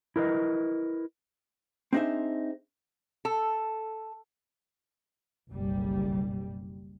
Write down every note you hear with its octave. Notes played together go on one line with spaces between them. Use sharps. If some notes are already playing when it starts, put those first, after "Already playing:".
E4 A#4 B4 D#5
C4 D4 D#4 G#4 C5 E5
A4
F#1 B1 G3